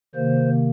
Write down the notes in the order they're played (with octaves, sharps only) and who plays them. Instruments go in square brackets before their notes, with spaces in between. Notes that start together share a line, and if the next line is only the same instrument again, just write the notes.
[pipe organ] C3 D#3 A#3 C5